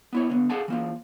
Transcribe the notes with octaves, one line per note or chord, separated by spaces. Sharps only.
B3 E4 C#5
D3 B3
G#4 A4 F5 F#5 G#5 A5
E3 A#3 F4